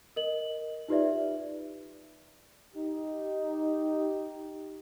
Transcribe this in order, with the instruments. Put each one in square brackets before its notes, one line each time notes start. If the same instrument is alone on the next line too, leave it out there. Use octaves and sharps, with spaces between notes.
[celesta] A#4 D#5 F#7
D#4 F4 G4 B4 D5 E5
[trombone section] D#4 G4